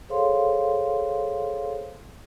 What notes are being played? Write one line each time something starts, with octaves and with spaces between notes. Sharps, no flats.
G#4 A4 C5 C#5 F5 C6